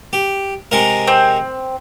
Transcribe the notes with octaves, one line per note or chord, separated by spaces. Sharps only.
G4
C3 G#3 A#4
C4